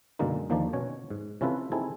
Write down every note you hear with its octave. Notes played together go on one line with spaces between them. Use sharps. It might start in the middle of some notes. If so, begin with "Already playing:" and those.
F#2 B2 D3 G#3 A#3 D#4
D#2 D3 F3 A#3 D#4 D5
B2 C#4 C#5
G#2
C3 C#4 E4 F4 A4 B4
C4 D#4 E4 G#4 A4